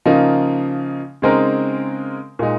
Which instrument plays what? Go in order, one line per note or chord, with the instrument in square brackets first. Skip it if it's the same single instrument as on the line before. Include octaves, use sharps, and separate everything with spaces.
[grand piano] C#3 F3 A#3 D#4
C#3 G#3 C4 D#4 A#4
A#2 G#3 D#4